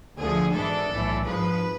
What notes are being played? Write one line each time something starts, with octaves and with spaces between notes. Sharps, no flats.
D2 D3 F3 A3 G#4
G#1 G#2 E3 G#3 D4 A4
B1 A2 E3 A3
G#1 G#2 F3 G#3 B4